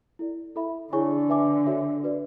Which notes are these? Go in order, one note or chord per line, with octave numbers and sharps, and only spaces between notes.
E4 A4 D5
E4 A4 E5 B5
D3 E4 G#4 C#5 G#5 C#6
B4 E5 G#5 D6
D4 F#4 A4 C#5 E5
F#4 B4 D5